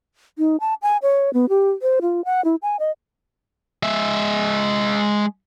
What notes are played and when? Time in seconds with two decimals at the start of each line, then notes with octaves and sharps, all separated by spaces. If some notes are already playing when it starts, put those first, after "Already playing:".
0.38 D#4
0.60 A5
0.82 G#5
1.02 C#5
1.34 B3
1.49 G4
1.82 C5
2.02 F4
2.25 F#5
2.44 E4
2.62 G#5
2.80 D#5
3.83 G#3 E5